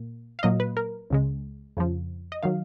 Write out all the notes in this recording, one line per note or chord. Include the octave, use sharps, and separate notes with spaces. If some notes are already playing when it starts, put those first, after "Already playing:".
Already playing: A#2 A#3
F5
A#2 F#3 A#3 D#5
B4
A#4
C#2 C#3 G#3
F2 C#3 F3
D#5
D#3 F#3 F5